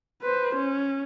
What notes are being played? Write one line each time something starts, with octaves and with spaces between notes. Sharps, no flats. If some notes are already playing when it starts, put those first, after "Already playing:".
B4 C5
C#4